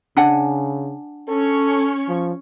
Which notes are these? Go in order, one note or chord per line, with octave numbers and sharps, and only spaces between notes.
C#3 D4 F#5 G#5
C#4 A4 C#5
F3